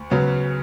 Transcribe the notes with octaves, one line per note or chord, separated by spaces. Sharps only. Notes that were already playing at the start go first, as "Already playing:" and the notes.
Already playing: D2
C#3 F#3 B3